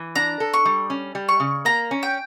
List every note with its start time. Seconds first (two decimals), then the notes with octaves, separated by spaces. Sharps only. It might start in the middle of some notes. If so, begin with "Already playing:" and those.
Already playing: E3
0.15 D4 A#5
0.40 A4
0.54 C#6
0.65 G3
0.90 C#4
1.15 G3
1.29 C#6
1.40 C#3
1.65 A#3 A#5
1.91 C#4
2.03 G5